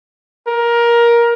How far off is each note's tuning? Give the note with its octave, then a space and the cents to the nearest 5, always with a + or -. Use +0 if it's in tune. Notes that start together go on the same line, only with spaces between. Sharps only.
A#4 +15